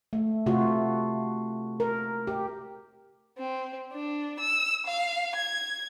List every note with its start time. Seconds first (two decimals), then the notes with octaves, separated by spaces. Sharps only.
0.13 A3
0.46 C3 A3 F4 F#4
1.80 A#4
2.27 G4
3.37 C4
3.93 D4
4.40 E6
4.87 F5
5.36 G#6